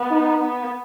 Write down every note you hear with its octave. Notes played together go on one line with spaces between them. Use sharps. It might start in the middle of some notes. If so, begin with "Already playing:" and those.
Already playing: B3
D#4
B3